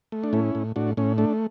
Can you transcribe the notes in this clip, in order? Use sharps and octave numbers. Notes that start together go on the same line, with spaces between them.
A3
D4
A2 C#4 E4
A2
A2 D4 F#4
A2 C#4
A3 D4